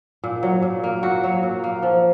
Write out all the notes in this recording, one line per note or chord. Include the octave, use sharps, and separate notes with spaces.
A#2
F#3
A#2
A#3
A#2 F#4
F#3
A#2
A#3
F3